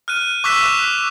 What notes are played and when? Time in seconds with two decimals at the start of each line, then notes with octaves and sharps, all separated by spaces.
0.08 F6 F#6 D#7
0.44 C#6 D6 E6 F#6 B6 E7